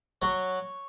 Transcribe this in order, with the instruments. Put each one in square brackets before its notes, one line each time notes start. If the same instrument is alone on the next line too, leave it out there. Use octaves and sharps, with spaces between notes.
[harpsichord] F#3 C#5